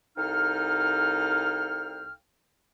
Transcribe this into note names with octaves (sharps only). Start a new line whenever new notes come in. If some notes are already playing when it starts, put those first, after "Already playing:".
C2 D#4 A4 F5 G5 F6